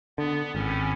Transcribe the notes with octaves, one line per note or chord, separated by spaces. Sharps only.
D3 B3
G#1 A2 C#4